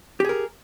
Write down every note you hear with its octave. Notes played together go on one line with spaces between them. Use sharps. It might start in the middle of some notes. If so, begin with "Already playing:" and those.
G4 G#4 A#4